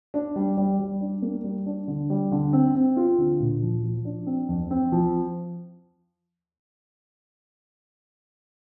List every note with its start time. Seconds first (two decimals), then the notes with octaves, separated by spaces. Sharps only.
0.14 D4
0.36 G3
0.57 G3
0.79 G3
1.01 D4
1.22 A#3
1.44 G3
1.66 D4
1.88 D3
2.10 G3
2.31 D3
2.53 C4
2.75 C4
2.97 F4
3.18 D3
3.40 A#2
3.62 F3
3.84 F3
4.05 D4
4.27 C4
4.49 F2
4.71 C4
4.92 F3